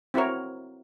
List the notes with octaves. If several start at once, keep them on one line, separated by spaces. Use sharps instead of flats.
C4 E4 F#4 A#4 C#5